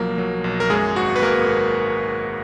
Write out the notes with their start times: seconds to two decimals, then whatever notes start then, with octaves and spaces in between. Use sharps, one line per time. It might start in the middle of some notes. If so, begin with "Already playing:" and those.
Already playing: B1 F3 F#3 A#3 A#4
0.18 F#3
0.44 B1
0.60 A#4
0.70 F#2 G#3 G#4
0.96 G#1 F#4
1.16 B4
1.22 G#1 A#3 A#4
1.48 G#1